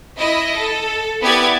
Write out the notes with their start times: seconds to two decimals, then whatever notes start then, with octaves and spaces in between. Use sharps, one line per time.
0.18 E4 D#5
0.55 A4
1.21 B3 E4 G4 B4 D5 G#6